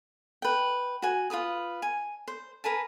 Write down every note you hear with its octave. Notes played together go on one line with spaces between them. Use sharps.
B4 G5
F#4 G#5
F4 A4 B4 D#6
G#5
C5
A#4 B4 G#5 A5